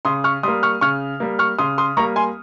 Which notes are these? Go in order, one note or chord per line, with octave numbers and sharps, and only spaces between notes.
C#3 C6 D#6
C#6 F6
G3 A#3 C6 D#6
C#6 F6
C#3 C#6 F6
G3 A#3
C#6 F6
C#3 C6 D#6
C6 D#6
G3 A#3 A#5 C#6
G#5 C6